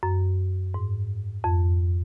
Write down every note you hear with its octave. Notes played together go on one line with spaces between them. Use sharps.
F#2
G#2
F2